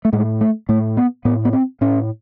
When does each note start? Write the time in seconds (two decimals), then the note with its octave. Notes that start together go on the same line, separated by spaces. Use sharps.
0.05 A3
0.13 A2 G#3
0.41 A3
0.69 A2 A3
0.97 B3
1.25 A2 B3
1.45 B3
1.53 C4
1.81 A2 C#4